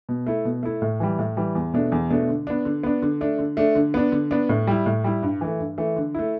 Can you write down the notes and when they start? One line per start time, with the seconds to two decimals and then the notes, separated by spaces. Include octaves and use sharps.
0.09 B2
0.27 A3 E4
0.45 B2
0.63 A3 E4
0.82 A2
1.00 E3 G3
1.19 A2
1.37 E3 G3
1.55 E2
1.74 B2 A3 D4
1.92 E2
2.10 B2 A3 D4
2.29 D3
2.47 B3 D4
2.65 D3
2.83 B3 D4
3.02 D3
3.21 A3 D4
3.38 D3
3.57 A3 D4
3.75 D3
3.94 B3 D4
4.12 D3
4.31 B3 D4
4.49 A2
4.67 G3 E4
4.86 A2
5.04 G3 E4
5.23 G2
5.41 E3 A3
5.59 G2
5.78 E3 A3
5.96 D3
6.14 A3 E4